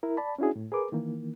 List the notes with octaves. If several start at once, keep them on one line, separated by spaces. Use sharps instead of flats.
E4 A#4
D5 A5 B5
C#4 D4 E4 F#4 G#4
A2
G#4 A#4 B4 D6
D#3 E3 A#3